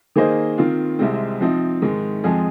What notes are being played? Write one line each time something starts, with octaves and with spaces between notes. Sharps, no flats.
D#3 A#3 G#4 C5 D#5
D#3 C4 F4
C2 C3 G#3 C4
F3 C4 D#4
G#2 D#3 G#3
F2 F3 G#3 C4 G#4